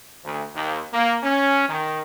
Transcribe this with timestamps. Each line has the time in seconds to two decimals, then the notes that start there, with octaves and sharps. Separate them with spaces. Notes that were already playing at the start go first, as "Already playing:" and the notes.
0.24 D2
0.54 D#2
0.93 A#3
1.23 C#4
1.68 D#3